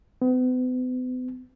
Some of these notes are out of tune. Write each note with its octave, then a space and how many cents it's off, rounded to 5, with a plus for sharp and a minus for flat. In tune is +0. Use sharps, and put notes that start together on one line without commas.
B3 +40